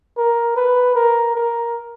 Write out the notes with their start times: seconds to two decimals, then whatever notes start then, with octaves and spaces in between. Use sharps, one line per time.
0.18 A#4
0.57 B4
0.95 A#4
1.35 A#4